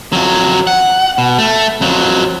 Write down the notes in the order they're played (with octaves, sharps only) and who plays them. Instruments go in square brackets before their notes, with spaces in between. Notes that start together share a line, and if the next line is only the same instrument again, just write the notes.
[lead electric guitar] F2 F#3
F#5
B2
A3
F2 F#3